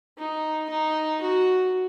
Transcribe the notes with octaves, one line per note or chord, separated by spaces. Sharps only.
D#4
D#4
F#4